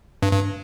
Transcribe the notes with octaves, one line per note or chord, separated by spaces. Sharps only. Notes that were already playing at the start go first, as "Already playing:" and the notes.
G2
G2